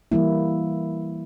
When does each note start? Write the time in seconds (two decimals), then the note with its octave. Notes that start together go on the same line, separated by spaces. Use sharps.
0.12 E3 G3 A#3 E4